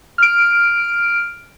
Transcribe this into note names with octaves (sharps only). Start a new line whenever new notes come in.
F6 D7